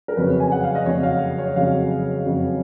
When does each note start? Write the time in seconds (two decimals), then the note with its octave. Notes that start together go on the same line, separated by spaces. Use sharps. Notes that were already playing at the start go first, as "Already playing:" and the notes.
0.08 A#4
0.16 F2 C#3 F#3 C#4 B4
0.40 G#5
0.52 F#5
0.63 F5
0.75 D#5
0.86 F2 C#3 F#3 C#4 C#5
1.03 F5
1.38 C#5
1.56 F2 C#3 F#3 C#4 F5
2.25 F2 C#3 F#3 C#4